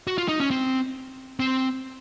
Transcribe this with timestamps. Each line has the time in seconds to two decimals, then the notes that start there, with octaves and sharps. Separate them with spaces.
0.07 F#4
0.18 F4
0.28 D#4
0.40 C#4
0.51 C4
1.40 C4